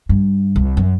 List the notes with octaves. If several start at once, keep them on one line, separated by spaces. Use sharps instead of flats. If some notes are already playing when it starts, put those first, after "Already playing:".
G2
C2
F#2